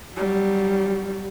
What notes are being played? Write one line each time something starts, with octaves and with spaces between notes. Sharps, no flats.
F#3 G3